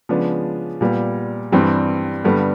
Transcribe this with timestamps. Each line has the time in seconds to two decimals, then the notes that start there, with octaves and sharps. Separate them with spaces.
0.09 C#3 F3 G#3 B3 D4
0.81 A#2 G3 B3
1.52 G2 E3 G3 C4
2.24 G2 D3 G3 B3